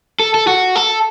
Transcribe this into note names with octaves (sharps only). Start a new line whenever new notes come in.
A4
A4
F#4
A4